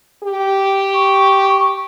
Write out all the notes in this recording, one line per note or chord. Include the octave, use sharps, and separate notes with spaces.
G4
C#6